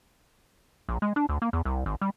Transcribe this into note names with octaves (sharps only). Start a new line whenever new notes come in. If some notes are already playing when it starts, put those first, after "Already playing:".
A#1
G#3
D4
D2
A#3
E2
C2
G#1
G3